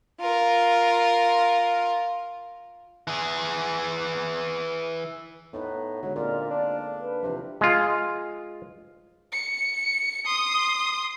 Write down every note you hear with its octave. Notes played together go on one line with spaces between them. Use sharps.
F4 A#4
E3 G#4
A2 B3 D#4 B4
D3 F#3 G#3
A#2 A#3 C4 A#4 D5
D4
B4
C3 E3 F3 D4
G#3 F4
C#7
C6 D#6